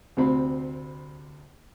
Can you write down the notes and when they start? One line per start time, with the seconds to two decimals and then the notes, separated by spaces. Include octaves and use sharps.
0.17 D2 C3 C4 B5